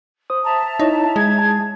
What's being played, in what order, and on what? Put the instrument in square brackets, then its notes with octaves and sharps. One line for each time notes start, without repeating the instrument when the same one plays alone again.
[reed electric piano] C5 D#6
[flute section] E5 A5 A#5
[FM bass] D#4 [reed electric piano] E4 C#5
[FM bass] G#3 [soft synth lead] G#6
[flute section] G#4 [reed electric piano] A5